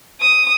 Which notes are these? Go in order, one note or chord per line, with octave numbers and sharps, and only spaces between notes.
D#6